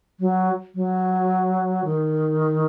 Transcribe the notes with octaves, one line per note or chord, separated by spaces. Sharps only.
F#3
F#3
D#3